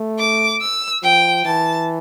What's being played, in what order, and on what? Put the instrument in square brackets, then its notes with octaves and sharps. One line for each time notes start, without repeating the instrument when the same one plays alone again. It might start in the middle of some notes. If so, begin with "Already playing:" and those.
Already playing: [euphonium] A3
[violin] D6
E6
[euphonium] F3 [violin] G5
[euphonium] E3 [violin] A5